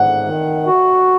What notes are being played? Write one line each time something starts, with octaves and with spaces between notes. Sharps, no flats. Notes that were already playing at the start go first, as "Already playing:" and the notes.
Already playing: G#2 F#5
D#3
F#4